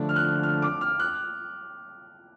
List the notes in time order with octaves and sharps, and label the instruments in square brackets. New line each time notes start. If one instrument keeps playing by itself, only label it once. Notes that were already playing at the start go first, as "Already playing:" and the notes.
Already playing: [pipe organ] D3 F3 A3 D4
[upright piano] F6
F#6
F6
D6
F6
F#6